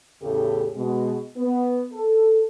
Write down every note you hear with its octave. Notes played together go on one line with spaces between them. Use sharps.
E2 A2 C#3 C#4 G4 A4
B2 G#3
B3
A4